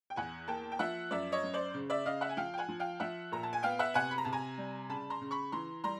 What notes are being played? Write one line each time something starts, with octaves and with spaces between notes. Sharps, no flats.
G5
E2 F#5 G#5
A#3 G5 A5
G5
F3 E5 F#5
F#2 D5 E5
C#5 D#5
F#2
C5 D5
C#3
D5 E5
C#3 D#5 F5
E5 F#5
G#5
F3 F5 G5
G5
F#5 G#5
F3
F5 G5
F3 E5 F#5
A#2 A#5
A5
G#5
B3 F5 G5
E5 F#5
C3 F#5 G#5
B5
A#5
C3 A5
G#5 A#5
G3
C#3 A5 B5
A#5 C6
C#3
B5 C#6
E3 A#5 C6
G3 A#5 C6